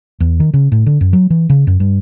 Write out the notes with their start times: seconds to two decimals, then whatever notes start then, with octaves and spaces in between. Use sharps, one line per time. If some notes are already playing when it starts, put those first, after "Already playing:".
0.20 E2
0.40 D#3
0.54 C#3
0.72 A2
0.86 D3
1.01 F#2
1.13 F#3
1.30 E3
1.50 C#3
1.67 F#2
1.80 G2